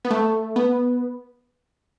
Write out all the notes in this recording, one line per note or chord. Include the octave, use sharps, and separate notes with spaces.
B3
A3
B3